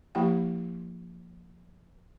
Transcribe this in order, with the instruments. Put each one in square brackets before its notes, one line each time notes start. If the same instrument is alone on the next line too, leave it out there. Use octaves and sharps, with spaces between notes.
[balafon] F3 A#3 E4 G4 F#5 G5